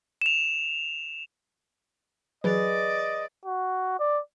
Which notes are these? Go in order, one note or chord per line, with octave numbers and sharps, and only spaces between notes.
E7 F7
E3 F#3 G#4 B4 D5 D#5
F#4
D5